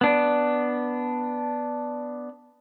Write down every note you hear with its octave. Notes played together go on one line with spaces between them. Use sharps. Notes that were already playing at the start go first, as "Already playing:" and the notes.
B3 D4